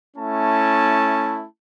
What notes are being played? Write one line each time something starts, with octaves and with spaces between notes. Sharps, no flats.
A3 C#4 E4 A5